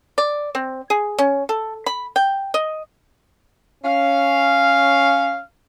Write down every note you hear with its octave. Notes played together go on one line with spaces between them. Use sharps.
D5
C4
G#4
C#4
A4
B5
G5
D#5
C#4 F5